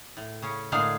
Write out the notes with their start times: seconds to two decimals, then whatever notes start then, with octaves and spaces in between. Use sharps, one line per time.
0.17 A2
0.42 C#3 C#4
0.72 A2 D3 G#3 A#3 G#4 F5